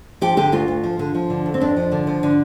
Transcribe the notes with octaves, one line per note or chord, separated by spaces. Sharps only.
F3 G4
D3 G4
D2 F4
D2
F3
D3
F3
D3
F2
C4
F2 D4
F3
D3
F3
D3